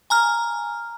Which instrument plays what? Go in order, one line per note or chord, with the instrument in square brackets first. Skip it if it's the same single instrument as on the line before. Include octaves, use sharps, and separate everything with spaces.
[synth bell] G#5 A#5 F6